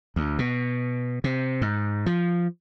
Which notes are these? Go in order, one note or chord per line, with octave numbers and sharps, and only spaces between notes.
D2
B2
C3
G#2
F3